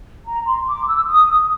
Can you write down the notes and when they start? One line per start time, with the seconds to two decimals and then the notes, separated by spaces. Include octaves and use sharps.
0.26 A#5
0.47 C6
0.66 D6
0.87 E6
1.07 D#6